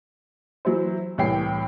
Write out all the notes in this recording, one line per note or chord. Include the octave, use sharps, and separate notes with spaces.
E3 F#3 E4 C5
C2 A2 E3 C#5 G5 C7